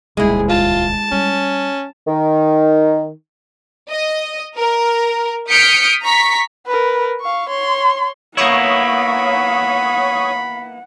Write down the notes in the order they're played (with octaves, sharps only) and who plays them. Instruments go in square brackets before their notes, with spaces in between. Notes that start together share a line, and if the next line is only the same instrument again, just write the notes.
[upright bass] D#1 C#2 [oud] G#3 E4 [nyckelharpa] G#4
[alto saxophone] F4 [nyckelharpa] A5
[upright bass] G3 [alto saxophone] C#4
[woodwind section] D#3
[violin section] D#5
A#4
D#6 F6 G6 B6 C#7 D7
A#5 C#6 B6
[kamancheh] A#4 B4
F5 C#6
C#5 C6
[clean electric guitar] A#3 B3 E4 [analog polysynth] C#5 C#6 D#6 [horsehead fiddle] F#5 [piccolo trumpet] B5